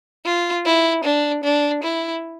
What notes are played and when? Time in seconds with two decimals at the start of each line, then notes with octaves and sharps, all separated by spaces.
0.25 F4
0.65 E4
1.04 D4
1.44 D4
1.83 E4